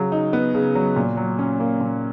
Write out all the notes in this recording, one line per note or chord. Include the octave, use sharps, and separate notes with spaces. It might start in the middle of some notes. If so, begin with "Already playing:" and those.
Already playing: C#3 F#3
D#4
B3
C#3
F#3
A#2
F#3
C#4
A#3
A#2